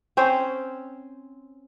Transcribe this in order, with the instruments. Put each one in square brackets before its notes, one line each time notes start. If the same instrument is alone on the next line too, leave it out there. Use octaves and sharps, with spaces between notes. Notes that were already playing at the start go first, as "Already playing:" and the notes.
[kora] C4 C#4 C5